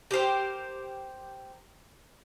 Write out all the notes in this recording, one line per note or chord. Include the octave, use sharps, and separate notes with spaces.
G4 A#4 C5 G5